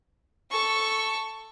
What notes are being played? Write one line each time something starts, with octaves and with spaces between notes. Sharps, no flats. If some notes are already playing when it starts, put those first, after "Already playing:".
A4 C#6